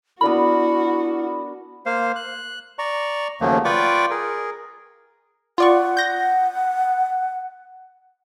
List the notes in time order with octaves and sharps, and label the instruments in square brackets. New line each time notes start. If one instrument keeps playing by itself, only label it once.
[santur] B3 D4 A#4 [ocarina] E4 [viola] F#4 [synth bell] B5
[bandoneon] A#3 C5 F5
F#6
D5 A#5 C#6
D#2 C#3 F3 F#3 A3 A#3
F4 B4 D5 G5 C#6 D6
G#4 A#4
[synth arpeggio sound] F4 D5 C#6 [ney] F#5
[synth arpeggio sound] G6 A#6